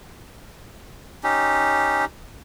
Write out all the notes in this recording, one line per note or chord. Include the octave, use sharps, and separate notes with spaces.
C#4 D#4 G4